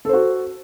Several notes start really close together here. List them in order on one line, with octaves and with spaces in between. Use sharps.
A4 C5 F#4